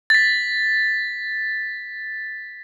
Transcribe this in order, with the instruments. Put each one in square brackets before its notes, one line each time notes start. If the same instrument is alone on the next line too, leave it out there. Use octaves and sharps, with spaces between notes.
[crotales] A6 B6